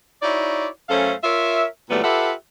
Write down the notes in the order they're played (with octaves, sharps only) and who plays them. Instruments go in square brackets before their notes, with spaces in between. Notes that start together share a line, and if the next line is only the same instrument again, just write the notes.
[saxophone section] D#4 E4 F#4 C#5 D5
F#2 A3 C#4 A4 C5 F5
F4 A#4 C#5 E5
A#2 E3 F#3 G3 A3 B3
F4 G4 A4 B4 E5 F#5